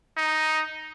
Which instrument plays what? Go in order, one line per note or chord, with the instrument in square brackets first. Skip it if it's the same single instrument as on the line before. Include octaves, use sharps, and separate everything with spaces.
[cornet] D#4